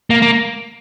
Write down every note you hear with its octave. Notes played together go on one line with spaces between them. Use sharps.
A#3
A#3